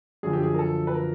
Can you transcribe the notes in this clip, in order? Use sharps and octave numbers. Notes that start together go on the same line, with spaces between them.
F#2 D3 F3 G#4
G4
G#4
A#4
A4
B4
A#4